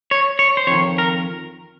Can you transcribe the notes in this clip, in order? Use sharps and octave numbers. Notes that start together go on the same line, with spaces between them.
C#5
C#5
C5
F2 D#3 C#5
A#4